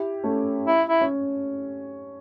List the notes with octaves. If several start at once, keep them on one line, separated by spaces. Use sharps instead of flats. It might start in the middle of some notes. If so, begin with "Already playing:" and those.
Already playing: E4 G4
A3 C#4
E4
E4
C#4